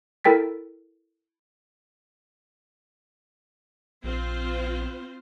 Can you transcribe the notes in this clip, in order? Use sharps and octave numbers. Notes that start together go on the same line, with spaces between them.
E4 A4 A#4 G5 A6 B6
A#1 C4 F4 C5